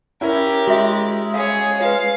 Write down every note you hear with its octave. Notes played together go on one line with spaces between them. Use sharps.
C#4 E4 G4 A#4
G#3 F#4 E5
G#4 C#5 F5 D#6
F4 B4 F5